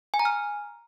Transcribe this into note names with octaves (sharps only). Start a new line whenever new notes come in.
G#5
A#5
F6